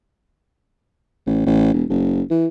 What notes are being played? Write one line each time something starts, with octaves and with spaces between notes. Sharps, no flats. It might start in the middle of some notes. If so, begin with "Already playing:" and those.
A1
A1
E1
F#1
E3